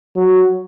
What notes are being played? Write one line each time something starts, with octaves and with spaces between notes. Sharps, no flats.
F#3